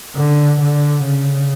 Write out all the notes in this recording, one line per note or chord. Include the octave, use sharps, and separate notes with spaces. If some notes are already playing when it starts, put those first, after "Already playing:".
D3
D3
C#3